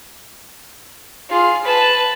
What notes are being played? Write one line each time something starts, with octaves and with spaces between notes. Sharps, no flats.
F4 G#4
B4 A5